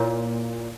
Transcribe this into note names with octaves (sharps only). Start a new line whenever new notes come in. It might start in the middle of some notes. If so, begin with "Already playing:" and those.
Already playing: A#2 E4 A#4 C#5